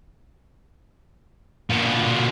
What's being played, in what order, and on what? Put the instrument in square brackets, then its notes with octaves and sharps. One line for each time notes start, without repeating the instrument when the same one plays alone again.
[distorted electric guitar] B2 D3 [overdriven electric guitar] A#3 F4